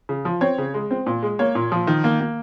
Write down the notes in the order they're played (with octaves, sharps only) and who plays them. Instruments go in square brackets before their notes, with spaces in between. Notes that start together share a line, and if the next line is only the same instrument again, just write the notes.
[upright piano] C#3
F3
C4 C#5
C#3
G#3
C4
A#2
G#3
A#3 C#5
A#2
F3
D#3
A#3
A#3